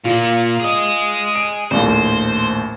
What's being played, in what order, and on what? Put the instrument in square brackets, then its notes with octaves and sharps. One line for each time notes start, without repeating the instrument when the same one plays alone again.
[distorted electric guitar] A#2 A#3 [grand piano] F4
[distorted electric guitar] G#4 D#5
[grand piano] D7
[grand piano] A#1 D#2 A2 [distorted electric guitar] C5